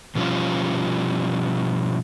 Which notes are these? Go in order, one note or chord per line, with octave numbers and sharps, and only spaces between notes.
B2 F3 G3 C#4 F4